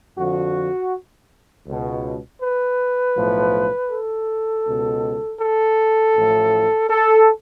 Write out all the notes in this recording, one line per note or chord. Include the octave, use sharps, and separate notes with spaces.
F2 D3 F3 F#4
C#2 B2
B4
B1 A2 F3
A4
C#2 B2
A4
A1 A2 F3
A4